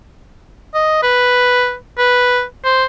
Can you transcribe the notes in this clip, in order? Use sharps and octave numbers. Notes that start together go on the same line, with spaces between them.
D#5
B4
B4
C5